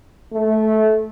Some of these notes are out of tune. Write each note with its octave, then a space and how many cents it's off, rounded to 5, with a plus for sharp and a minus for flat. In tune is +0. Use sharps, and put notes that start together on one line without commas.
A3 -15